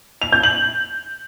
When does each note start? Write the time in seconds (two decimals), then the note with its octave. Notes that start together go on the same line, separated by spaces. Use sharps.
0.22 F7
0.32 G6
0.43 F#7